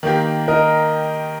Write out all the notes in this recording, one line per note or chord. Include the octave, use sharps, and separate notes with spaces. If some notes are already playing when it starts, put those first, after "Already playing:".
D#3 A#3 G4
A#4 D#5